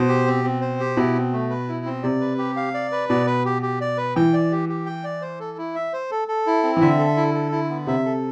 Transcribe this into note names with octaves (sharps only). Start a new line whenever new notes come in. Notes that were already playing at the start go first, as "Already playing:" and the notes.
Already playing: B2 C5
G4
C4
C4
C5
G4
B2 E4
C4
A3
B4
E4
C4
C3 D5
B4
G4
F5
D5
B4
B2 D5
B4
G4
G4
D5
B4
E3 G5
D5
G4
G4
G5
D5
C5
A4
E4
E5
C5
A4
A4
E4
C4
E3
D3 E5
A4
E4
A4
E4
B3
C3 E5
A4